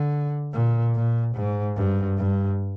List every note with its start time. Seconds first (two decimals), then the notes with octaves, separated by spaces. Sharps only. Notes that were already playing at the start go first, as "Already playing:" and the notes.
Already playing: D3
0.53 A#2
0.95 A#2
1.35 G#2
1.76 G2
2.18 G2